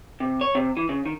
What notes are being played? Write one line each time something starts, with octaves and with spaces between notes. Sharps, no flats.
C3
C#5
C3
E3
C#3
D#3